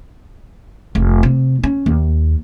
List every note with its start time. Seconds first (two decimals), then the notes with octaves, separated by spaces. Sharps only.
0.95 F1
1.23 C3
1.64 C#4
1.86 D#2